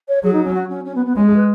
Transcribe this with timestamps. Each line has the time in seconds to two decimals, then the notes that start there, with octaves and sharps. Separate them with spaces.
0.08 C#5
0.23 F#3 G#4
0.33 D#4
0.44 C#4
0.54 F#4
0.69 C#4
0.85 C#4
0.95 B3
1.06 B3
1.16 G#3 C#4
1.26 G#4
1.36 B4